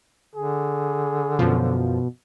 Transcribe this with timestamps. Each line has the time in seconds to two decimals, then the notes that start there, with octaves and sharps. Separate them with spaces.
0.35 D3 G#4
1.39 F#2 B2 F3